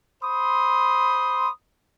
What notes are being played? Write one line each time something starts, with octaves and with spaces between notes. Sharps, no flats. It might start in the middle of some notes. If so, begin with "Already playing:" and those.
C5 B5 C6 D#6